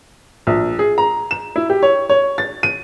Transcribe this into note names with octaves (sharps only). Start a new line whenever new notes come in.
A#1
G#4
A#5
E7
E4
G4
C#5
C#5
A6
D#7